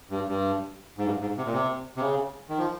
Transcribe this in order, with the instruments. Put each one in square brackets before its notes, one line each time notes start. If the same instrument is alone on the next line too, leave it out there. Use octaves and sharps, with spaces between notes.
[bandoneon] G2
G2
G#2
G2
G#2
C3
A#2
C3
C3
C#3
D#3
F3